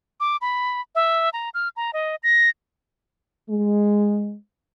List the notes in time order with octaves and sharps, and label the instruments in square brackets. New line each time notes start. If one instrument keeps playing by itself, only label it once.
[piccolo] D6
B5
E5
A#5
F6
A#5
D#5
A#6
[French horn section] G#3